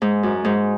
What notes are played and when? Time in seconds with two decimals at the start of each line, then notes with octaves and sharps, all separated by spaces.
0.02 G#2
0.23 F#2
0.45 G#2